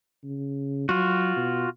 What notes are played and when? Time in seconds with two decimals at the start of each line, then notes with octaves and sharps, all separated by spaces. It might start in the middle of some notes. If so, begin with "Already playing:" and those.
0.24 C#3
0.89 F#3 F4 F#4
1.36 B2